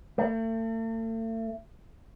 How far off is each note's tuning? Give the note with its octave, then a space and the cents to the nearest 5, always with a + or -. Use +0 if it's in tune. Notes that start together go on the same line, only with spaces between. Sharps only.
A3 +40